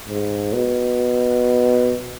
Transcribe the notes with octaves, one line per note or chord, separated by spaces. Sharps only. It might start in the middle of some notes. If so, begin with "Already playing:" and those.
G#2
B2